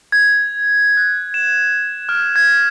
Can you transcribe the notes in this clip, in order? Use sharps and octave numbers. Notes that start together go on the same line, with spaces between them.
G#6
F#6
E7
F6
G#6